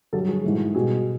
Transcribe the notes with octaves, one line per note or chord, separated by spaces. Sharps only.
G2 D3 F#3 G4 A4
F#4 G#4
G#2 E3 A3
B2 G3 F#4 G#4